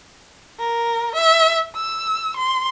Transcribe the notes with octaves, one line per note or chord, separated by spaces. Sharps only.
A#4
E5
E6
C6